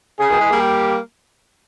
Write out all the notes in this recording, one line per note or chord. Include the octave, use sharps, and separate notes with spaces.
C#3 G#4
B2 D#3
E3 G#3
G3 A#3
G4